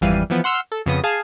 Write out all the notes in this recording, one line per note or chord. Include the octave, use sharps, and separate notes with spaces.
G#1 F2 E3 G3 F5 D#7
E3 F3 B3
F#5 C6 E6 F6
A4
F2 C#3 B3 D#6
G#4 F5 G#5 A5